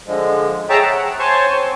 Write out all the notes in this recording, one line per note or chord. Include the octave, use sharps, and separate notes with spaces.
D3 F3 G#3
G#4 C#5 E5 G5 A5 A#5
F#5
C5 C#5 G#5 A5 C6 C#6
C4